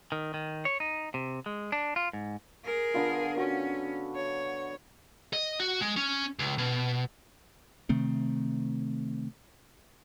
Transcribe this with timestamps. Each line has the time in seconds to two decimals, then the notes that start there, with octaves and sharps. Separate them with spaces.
0.12 D#3
0.34 D#3
0.65 C#5
0.80 D#4
1.14 C3
1.46 G#3
1.72 D4
1.96 F4
2.13 G#2
2.64 G#4 A#4
2.94 D3 B3 F4
3.37 C#4 F#4
4.15 C#5
5.33 D#5
5.60 F#4
5.81 G#3
5.97 C#4
6.39 C#2
6.58 B2
7.89 C3 D#3 A3 C4